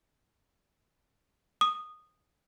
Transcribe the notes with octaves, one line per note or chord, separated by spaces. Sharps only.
D#6